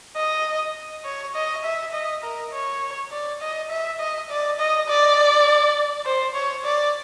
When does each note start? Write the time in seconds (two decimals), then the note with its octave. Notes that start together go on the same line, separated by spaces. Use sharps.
0.16 D#5
1.05 C#5
1.35 D#5
1.64 E5
1.93 D#5
2.23 A#4
2.53 C#5
3.11 D5
3.41 D#5
3.70 E5
4.00 D#5
4.30 D5
4.59 D#5
4.88 D5
6.05 C5
6.35 C#5
6.64 D5